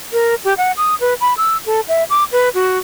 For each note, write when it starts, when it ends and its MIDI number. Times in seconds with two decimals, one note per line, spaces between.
0.13 0.35 70
0.45 0.54 67
0.58 0.72 78
0.77 0.95 87
1.00 1.14 71
1.21 1.33 83
1.37 1.57 88
1.66 1.81 69
1.88 2.04 76
2.10 2.24 86
2.32 2.49 71
2.55 2.78 66